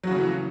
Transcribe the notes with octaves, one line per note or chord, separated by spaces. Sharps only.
C#3 E3 F#3 A3 F#4